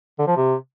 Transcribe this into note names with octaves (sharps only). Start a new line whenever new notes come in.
D3
F3
C3